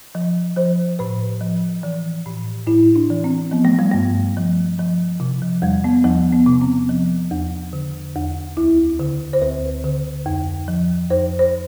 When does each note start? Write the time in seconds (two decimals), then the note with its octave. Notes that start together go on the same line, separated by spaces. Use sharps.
0.15 F3
0.57 F3 C5
0.99 A2 B4
1.41 F3
1.83 E3
2.26 A2
2.67 A2 E4
2.96 D4
3.10 E3
3.24 C4
3.51 F3 B3
3.65 A3
3.79 G3
3.91 G2 A3
4.37 F3
4.79 F3
5.20 C3
5.42 F3
5.62 E2 G3
5.84 B3
6.04 E2 F3
6.32 B3
6.46 C3
6.61 C4
6.89 F3
7.31 E2
7.73 D3
8.16 E2
8.57 D2 E4
8.99 D3
9.33 C5
9.41 D2 B4
9.84 D3
10.26 F2
10.68 F3
11.10 F2 C5
11.39 C5